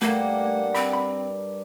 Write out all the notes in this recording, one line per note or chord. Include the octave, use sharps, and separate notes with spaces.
G2 A3 A#3 A#4 F#5 G5 A#5
C4 B5
B5